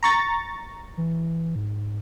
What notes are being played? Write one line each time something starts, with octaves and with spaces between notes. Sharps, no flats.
A#5 C#6 A6
E3
G#2